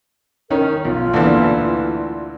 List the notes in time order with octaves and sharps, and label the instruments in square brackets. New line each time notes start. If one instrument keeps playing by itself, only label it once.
[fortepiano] D#3 C#4 D#4 [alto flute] A#4
[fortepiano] B1 [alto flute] F4
[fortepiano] D2 A#2 E3